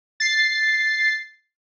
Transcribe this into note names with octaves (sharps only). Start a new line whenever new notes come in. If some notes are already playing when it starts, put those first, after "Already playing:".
A6 C7